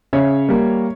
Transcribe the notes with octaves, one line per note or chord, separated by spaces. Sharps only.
C#3 C#5 E5
G3 A#3